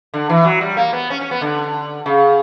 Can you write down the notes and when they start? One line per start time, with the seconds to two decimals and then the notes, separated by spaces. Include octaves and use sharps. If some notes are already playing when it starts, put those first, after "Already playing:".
0.14 D3
0.29 E3
0.45 F#3
0.61 G3
0.77 A#3
0.93 B3
1.10 C#4
1.21 C#4
1.31 B3
1.41 D3
2.06 C#3